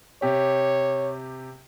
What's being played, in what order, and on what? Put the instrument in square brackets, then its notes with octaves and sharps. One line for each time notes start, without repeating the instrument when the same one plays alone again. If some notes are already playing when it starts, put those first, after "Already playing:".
[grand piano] C3 G4 [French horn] C#5